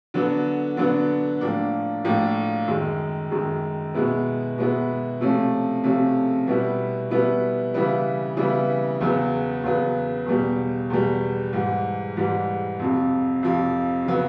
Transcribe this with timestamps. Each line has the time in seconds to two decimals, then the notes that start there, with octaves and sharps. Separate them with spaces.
0.14 D3 F#3 B3 D4
0.77 D3 F#3 B3 D4
1.41 A2 F3 A#3 D4
2.05 A2 F3 A#3 D4
2.68 F#2 D#3 G#3
3.31 F#2 D#3 G#3
3.94 B2 G#3 B3 E4
4.58 B2 G#3 B3 E4
5.21 C3 F3 A3 C#4
5.84 C3 F3 A3 C#4
6.47 B2 G3 B3 E4
7.11 B2 G3 B3 E4
7.74 C#3 E3 G3 B3 E4
8.37 C#3 E3 G3 B3 E4
9.01 E2 C#3 F#3 B3
9.64 E2 C#3 F#3 B3
10.26 E2 B2 G3
10.90 E2 B2 G3
11.53 G#2 E3 G3
12.17 G#2 E3 G3
12.79 F2 C3 F3
13.43 F2 C3 F3
14.06 C#3 F#3 B3